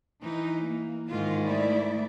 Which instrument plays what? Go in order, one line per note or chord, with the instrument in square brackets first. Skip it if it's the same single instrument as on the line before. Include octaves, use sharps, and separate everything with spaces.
[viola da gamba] E3 [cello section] D#4
[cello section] A#3
[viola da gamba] G#2 D#3 [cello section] F4
[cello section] A3 E4 D5